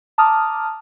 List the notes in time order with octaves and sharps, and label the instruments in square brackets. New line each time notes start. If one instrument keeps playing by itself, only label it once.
[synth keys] A5 A#5 D6 D#6 F6